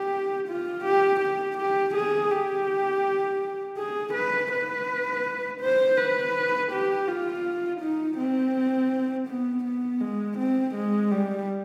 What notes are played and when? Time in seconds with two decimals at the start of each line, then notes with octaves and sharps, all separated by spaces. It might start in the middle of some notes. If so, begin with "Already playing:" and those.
Already playing: G4
0.48 F4
0.85 G4
1.20 G4
1.58 G4
1.95 G#4
2.31 G4
3.77 G#4
4.14 B4
4.52 B4
5.62 C5
5.97 B4
6.72 G4
7.07 F4
7.81 D#4
8.18 C4
9.27 B3
9.65 B3
10.01 G#3
10.38 C4
10.75 G#3
11.12 G3